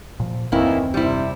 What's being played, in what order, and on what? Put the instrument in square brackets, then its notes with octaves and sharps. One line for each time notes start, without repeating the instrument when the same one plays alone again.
[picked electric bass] A#2 F3
[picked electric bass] F#1 D#2 C4 [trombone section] A2 D#3 E3 [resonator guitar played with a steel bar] A#3 E4
[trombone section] C3 [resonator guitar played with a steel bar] G3 E4